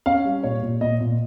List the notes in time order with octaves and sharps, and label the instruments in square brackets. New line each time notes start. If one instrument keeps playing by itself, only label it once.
[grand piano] C#4 F5
G3
A#2 C#5
A#2
A#2 D#5
A#2